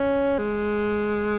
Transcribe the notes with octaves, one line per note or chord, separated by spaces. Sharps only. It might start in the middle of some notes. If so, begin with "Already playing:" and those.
Already playing: C#4
G#3